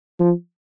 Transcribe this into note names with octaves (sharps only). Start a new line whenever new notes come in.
F3